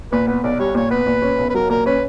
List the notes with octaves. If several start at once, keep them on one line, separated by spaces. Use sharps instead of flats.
A#2 B4
B3 B4
B1 D5
G3 C#5
A#2 C#5
B3 B4
A#2
C#4
B1
B4
F#3 A#4
A#2 A#4
C#4 B4